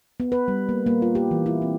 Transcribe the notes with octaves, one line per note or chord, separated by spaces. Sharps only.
B3
B4
G3
A#3
A#3
F4
G4
E3
E4
C4